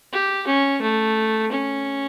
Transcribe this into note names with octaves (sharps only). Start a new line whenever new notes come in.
G4
C#4
A3
C#4